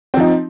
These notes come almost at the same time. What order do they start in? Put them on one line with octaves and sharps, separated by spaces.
C4 F3 D#4